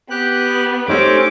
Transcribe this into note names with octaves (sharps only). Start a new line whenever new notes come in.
B3 G4 F#6
A3 C4 C#4 D#4 G4 D6